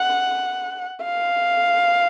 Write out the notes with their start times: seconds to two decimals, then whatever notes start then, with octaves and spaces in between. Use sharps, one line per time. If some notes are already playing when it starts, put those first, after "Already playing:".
Already playing: F#5
1.04 F5